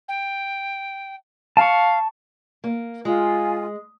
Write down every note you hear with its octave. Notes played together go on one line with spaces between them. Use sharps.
G5
F5 A5 C#6
A#3
G#3 F4 G#5